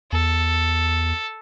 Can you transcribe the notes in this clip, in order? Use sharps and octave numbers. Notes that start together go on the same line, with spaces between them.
E2 A4